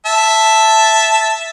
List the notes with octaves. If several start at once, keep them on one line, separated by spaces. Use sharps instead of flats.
E5 A5